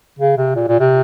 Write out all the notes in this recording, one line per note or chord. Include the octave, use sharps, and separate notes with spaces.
C#3
C3
A#2
A#2
C3